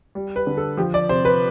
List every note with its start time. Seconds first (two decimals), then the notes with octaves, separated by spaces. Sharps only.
0.15 G3
0.36 B4
0.47 D3
0.57 A4
0.77 F3 G4
0.94 D5
1.09 C3 C5
1.25 B4